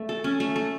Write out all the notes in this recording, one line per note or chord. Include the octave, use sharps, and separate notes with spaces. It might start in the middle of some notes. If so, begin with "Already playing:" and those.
Already playing: A3
A4
C#4
A3
A3